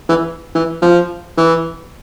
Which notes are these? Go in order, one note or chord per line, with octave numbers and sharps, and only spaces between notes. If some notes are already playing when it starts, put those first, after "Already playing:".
E3
E3
F3
E3